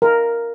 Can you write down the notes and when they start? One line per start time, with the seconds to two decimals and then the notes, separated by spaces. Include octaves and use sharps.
0.02 A#4